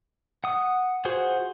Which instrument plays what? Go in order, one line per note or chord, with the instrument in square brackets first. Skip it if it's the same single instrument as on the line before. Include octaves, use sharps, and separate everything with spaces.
[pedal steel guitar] F#5 D#6
F4 F#4 G#4 C5 F#5